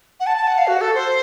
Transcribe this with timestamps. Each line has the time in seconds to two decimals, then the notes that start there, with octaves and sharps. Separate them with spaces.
0.20 F#5
0.27 A5
0.37 A5
0.47 F#5
0.58 F5
0.67 F#4
0.81 A4
0.95 C5